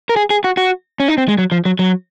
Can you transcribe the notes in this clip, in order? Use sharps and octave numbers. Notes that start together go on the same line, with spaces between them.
A#4
G#4
G#4
F#4
F#4
C#4
D#4
C4
G#3
F#3
F3
F#3
F#3